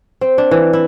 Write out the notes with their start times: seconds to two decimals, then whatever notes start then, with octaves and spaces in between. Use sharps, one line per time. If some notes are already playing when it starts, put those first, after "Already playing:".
0.21 C4
0.38 D4
0.51 E3
0.73 E4